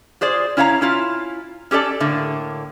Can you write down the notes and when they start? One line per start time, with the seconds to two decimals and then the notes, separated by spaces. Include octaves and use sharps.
0.21 F4 G#4 C5 D5
0.57 C#4 E4 C#5 F5 F#5 A#5
0.81 C#4 E4 F4
1.71 C#4 G4 A4 D5 A5
2.00 A2 D3 A#3